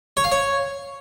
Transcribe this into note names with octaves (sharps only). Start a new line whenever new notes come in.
C#5
F5
C#5